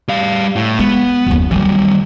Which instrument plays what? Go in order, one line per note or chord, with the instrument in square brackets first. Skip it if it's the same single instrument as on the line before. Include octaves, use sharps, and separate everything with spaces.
[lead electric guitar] G3 F5
A2
[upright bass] G#3 [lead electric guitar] B3
[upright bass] F#1 D#2
[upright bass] F#2 D#3 [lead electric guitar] E3 G3